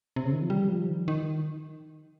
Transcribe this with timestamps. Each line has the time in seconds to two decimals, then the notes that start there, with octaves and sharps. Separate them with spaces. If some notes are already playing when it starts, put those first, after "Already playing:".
0.16 C3
0.25 C#3
0.33 D#3
0.42 F3
0.50 G3
0.69 F3
0.89 D#3
1.08 D#3